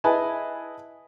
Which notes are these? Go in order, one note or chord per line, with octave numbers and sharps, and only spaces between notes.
E4 G#4 B4 D#5 G#5 A5